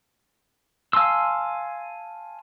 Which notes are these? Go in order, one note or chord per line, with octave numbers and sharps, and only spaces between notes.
F5 G#5 A5 C6 E6